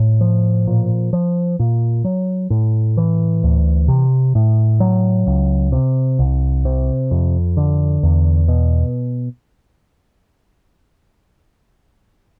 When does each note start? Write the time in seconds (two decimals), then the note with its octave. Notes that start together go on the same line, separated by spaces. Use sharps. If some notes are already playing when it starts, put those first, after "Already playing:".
Already playing: A2
0.21 F3
0.67 A#2
1.13 F3
1.59 A#2
2.04 F#3
2.50 A2
2.97 E3
3.44 D2
3.88 C3
4.35 A2
4.80 F#3
5.27 C#2
5.72 C3
6.19 C2
6.65 C3
7.11 F2
7.57 D3
8.03 E2
8.48 B2